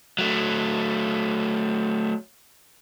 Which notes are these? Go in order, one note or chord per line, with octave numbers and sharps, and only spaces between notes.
F#3 A3